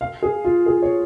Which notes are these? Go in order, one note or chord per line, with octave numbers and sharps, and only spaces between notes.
F5
G#4
F4
G#4
C#5